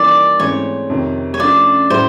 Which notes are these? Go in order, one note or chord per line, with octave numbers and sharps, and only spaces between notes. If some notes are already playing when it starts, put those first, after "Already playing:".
Already playing: E3 G3 A#3 D#4 D5
G#2 E3 A3 C4 C#5
F2 C3 D#3
C#5
D3 F3 A3 C#4 F4 D5
A2 F#3 A3 C#4 E4 C5